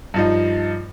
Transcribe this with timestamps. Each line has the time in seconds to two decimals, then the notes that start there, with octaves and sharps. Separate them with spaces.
0.14 G2 F3 D#4